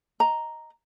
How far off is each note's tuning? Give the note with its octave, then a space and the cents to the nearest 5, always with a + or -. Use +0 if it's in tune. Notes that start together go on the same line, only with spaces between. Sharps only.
D#5 +0 A#5 +0